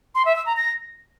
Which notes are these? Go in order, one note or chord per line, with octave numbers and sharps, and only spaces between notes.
C6
E5
E6
A#5
A#6